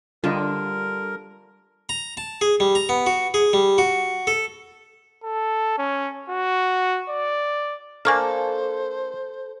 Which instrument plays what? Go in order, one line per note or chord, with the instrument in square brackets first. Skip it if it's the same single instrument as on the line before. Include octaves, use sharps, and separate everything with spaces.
[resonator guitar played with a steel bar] D3 [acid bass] G3 [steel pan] F4 D#5 [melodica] A#4
[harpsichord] A#5
A5
G#4
G3
A#5
B3
F#4
G#4
G3
F#4
A4
[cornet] A4
C#4
F#4
D5
[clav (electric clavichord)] A#3 D4 [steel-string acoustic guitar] A4 [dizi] C5 [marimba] G#5 C#6 F6